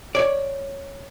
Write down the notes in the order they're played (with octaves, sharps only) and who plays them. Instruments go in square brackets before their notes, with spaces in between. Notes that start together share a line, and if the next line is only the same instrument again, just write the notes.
[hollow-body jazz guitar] C#5 D5